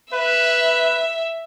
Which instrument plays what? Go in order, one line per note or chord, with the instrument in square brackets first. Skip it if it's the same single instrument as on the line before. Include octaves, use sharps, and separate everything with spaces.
[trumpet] B4 [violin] E5